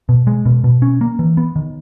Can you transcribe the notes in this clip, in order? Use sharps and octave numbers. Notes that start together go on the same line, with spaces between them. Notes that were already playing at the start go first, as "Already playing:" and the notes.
B2
G#3
B2
B2
C#4
A#3
E3
B3
D#3